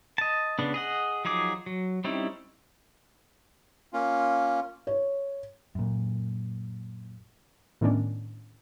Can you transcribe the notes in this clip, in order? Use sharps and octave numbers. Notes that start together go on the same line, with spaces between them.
D#5 A5
C#3 B3 D4
G#4 D#5 F#5
F3 F#3 D#4 G#4 D6
F#3
G3 C4 C#4 D#4 E4
A#3 C#4 F4
C#5
F#2 A#2
A2 D#3 B3 C#4 D4